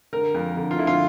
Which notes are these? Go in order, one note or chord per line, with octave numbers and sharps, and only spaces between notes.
D3 A#4
F2
D3
F4
D3 E4
F4